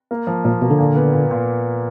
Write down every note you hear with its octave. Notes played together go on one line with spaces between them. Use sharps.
A#3
F3
A#2 F3
B2 A#3
D3
A#2
B3
A#2
A#2